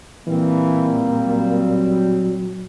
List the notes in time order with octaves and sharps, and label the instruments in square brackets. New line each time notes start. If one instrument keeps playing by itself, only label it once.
[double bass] A#2 [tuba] E3 [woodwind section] G3 C4 [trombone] A#3
[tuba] F#3